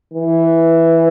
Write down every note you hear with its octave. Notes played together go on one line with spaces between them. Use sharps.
E3